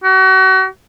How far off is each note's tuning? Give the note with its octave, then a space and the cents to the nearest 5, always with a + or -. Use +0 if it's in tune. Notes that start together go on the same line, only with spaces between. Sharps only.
F#4 +35